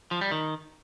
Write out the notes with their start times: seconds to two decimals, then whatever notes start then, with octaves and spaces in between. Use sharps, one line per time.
0.11 F3
0.21 G3
0.31 D#3